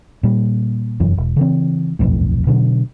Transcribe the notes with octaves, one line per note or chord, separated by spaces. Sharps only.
A#2 G3
F1 F#2 E3
E1
C#3 E3 C4
D#1 B1 F2 A2
B2 D3 F3 F#3